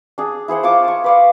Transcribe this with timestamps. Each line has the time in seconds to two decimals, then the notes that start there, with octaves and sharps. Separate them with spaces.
0.18 D4 G#4
0.48 E4 G#4 C5 F#5
0.63 F4 A5 C#6 D6
0.84 A5 C#6
1.04 B4 D5 F5